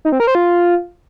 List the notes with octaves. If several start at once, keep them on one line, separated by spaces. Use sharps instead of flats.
D#4
C4
A#4
C5
F4